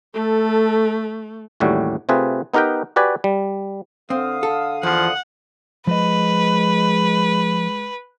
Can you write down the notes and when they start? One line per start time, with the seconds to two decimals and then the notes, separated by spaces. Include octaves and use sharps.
0.14 A3 A4
1.60 A1 D#2 A2 G3 F#4
2.09 C3 A3 C4 F4 G#4 B4
2.54 B3 D#4 G4 A#4 B4 G5
2.96 F#4 G4 B4 D5 G#5
3.24 G3
4.10 D3 C4 F5 D#6
4.43 A4
4.83 E2 F3 F#5
5.87 F3 G#3 B4 D#5